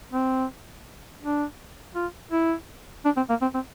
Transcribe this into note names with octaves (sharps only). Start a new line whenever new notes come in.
C4
D4
F4
E4
D4
C4
A#3
C4
C4